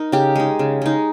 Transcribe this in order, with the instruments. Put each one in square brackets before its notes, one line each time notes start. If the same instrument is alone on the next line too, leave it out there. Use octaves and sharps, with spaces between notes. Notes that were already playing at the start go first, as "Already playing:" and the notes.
Already playing: [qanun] D#4 A#4
C#3 G4
G#3 D#4
C#3
G#3 D#4